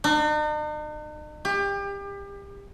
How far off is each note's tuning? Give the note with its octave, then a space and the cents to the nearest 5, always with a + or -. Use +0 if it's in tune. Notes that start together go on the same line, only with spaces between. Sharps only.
D#4 -45
G4 +30